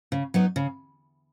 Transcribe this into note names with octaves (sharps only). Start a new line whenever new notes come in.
C#3
F#3 B3 D#4
C#3